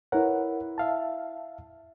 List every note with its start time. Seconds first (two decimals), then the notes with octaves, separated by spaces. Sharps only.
0.12 E4 A#4 B4 C#5 F#5
0.78 E5 F5 A5